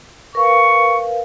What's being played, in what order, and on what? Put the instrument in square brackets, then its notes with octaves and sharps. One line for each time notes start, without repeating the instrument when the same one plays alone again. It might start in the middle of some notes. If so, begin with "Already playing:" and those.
[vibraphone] A#4 B4 F5 [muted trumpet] C#6